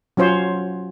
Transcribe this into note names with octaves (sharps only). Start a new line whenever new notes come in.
F#3 C#4 F4 C5 C#5